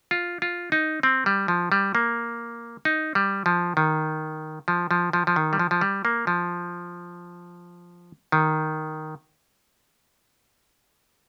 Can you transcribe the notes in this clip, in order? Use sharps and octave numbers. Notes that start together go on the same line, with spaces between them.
F4
F4
D#4
C4
G3
F3
G3
A#3
D#4
G3
F3
D#3
F3
F3
F3
F3
D#3
G3
F3
F3
G3
A#3
F3
D#3